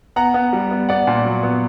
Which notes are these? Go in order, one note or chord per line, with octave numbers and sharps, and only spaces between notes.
B3 F#5 A#5
B3
G3
B3
B3 D5 F#5
A#2
F#3
B3